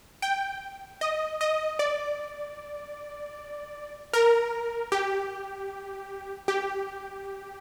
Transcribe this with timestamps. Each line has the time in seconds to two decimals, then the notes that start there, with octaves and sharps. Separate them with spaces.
0.22 G5
1.01 D#5
1.41 D#5
1.79 D5
4.13 A#4
4.92 G4
6.48 G4